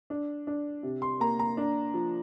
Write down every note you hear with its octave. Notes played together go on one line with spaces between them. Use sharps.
D4
D4
C3
C6
A#3 A#5
A#5
D4
F3